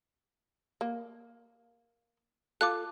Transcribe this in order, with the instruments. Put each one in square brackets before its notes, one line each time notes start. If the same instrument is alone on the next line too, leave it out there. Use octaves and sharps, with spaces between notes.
[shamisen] A#3
[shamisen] F4 A4 [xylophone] D6 F#6